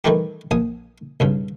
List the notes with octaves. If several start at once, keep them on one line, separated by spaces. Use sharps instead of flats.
D#3 E3 G3 A3 E4 G4
A#1 G#5 D#6
B1 G2 C#3